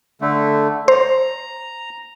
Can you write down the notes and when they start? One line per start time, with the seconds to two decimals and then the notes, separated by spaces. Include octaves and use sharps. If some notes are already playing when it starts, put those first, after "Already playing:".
0.21 D3 A3
0.88 C5 A#5